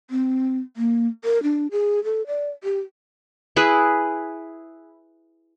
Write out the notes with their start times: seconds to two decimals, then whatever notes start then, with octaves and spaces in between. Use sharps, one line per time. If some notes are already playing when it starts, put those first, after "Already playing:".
0.11 C4
0.77 A#3
1.24 A#4
1.43 D4
1.71 G#4
2.04 A4
2.27 D5
2.64 G4
3.56 E4 G#4 B4